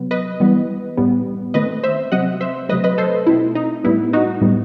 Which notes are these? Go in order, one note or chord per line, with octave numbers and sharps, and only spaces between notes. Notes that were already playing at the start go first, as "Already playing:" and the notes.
Already playing: C3 F#3 B3
B4 D#5
E3 G3 B3
A2 G3 B3
D#3 A3 C4 B4 D#5
C5 E5
C3 F#3 C4 D#5 F#5
C5 E5
C3 F#3 A3 B4 D#5
B4 D#5
A4 C5
B2 A3 C4 E4
D#4
A2 G3 B3 E4
D#4 F#4
A2 G3 B3